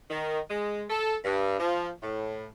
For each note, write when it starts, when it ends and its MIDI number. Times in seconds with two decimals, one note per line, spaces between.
0.11 0.39 51
0.50 0.84 56
0.90 1.16 69
1.25 1.58 43
1.60 1.90 53
2.02 2.47 45